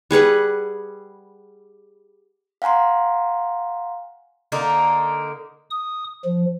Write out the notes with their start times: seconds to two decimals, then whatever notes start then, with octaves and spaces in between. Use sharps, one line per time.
0.11 G3 G#4 B4 F#5
2.62 F5 F#5 G#5 A#5 C6
4.52 D3 A#3 D#4
5.70 D#6
6.25 F3